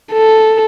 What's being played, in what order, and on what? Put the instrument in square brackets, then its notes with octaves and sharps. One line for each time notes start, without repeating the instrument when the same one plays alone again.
[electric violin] A4